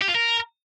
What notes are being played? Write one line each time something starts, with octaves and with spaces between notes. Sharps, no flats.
G4
F4
A#4